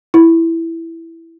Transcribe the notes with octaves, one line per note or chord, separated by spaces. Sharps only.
E4